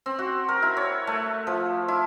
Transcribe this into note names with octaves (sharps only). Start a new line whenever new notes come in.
C4
F#4
A#4
E4
C#5
A3
F3
E4